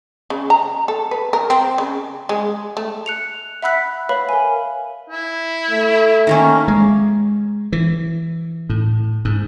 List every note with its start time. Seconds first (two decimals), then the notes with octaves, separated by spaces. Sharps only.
0.30 C#3
0.50 A#5
0.88 A4
1.11 B4
1.33 A#4
1.50 C4
1.78 C#3
2.29 G#3
2.77 A3
3.06 F#6 C#7 F7
3.62 E5 F#5 B5 E6 F#6 B6
4.09 B4 C#5 F5 B5
4.29 A#4 G#5
5.10 E4
5.70 A3
6.27 D#3 A#3 C#4
6.68 G#3
7.72 E3
8.70 A2
9.25 G#2